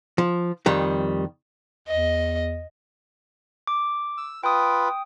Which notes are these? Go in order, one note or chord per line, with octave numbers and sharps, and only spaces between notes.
F3
F2 D#3 G3
E2 D#5
D6
E6
F4 B4 G5 D#6